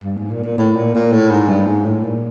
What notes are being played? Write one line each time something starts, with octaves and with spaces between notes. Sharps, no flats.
G2
G#2
A#2
A#2
A2
A#2
A#2
A2
G#2
G2
G#2
A2
A#2